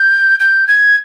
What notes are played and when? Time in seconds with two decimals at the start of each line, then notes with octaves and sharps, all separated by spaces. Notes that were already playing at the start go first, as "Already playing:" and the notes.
Already playing: G6
0.40 G6
0.68 G#6